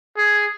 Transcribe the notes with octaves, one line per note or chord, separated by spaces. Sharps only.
G#4